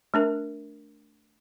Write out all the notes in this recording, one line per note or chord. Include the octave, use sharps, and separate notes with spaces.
A3 D4 A#4